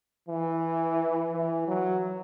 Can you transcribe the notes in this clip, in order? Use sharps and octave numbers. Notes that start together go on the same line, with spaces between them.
E3
E3
F#3